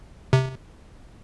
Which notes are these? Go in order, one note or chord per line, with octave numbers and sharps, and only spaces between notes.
C3